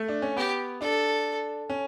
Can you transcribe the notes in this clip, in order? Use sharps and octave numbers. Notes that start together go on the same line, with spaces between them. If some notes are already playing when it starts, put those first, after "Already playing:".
Already playing: A3
D4
C#4
B3 G4
D4 A4
C#4